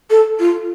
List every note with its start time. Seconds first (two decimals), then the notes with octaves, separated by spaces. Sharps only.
0.10 A4
0.39 F4